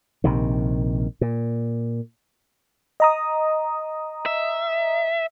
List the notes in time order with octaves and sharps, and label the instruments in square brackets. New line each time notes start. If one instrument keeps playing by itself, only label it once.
[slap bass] A#1 C3 D#3
A#2
[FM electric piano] D#5 A#5 D#6
[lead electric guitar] E5